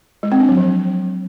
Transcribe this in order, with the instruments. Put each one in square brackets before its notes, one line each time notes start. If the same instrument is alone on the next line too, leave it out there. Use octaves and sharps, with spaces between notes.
[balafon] G#3
C4
D4
F#3
F3